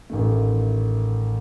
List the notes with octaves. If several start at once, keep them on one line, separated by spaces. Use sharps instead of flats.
A1 D#3 A3